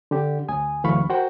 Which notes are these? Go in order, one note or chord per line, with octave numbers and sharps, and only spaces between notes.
D3 G4
D2 G#5 D#6
D2 E3 F#3 F5 B5 C#6
F#4 A#4 C5 F#5 G5